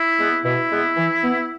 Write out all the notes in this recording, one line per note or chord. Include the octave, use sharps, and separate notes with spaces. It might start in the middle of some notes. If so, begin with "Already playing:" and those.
Already playing: E4
G#3 B3
B2 E4
G#3 B3
E3
B3